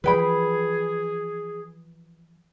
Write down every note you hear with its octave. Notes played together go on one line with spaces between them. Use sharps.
E3 F3 G#4 B4 G5 B5